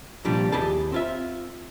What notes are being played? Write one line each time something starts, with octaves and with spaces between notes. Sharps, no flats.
C2 A#2 F3 G3 D4
D#2 E4 G4 G#4 A5
C4 F4 E5